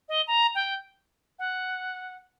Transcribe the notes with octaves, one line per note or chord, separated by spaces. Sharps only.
D#5
A#5
G5
F#5